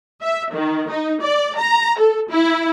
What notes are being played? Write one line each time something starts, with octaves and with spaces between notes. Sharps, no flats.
E5
D#3
D#4
D5
A#5
A4
E4